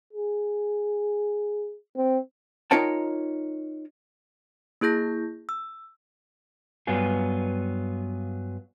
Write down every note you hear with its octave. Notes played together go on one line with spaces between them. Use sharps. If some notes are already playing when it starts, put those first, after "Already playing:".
G#4
C4
D#4 F4 A#4 C#5 G5 A5
A#3 E4 G#4 G6 A#6
E6
G2 F#3 B3 F4 G#4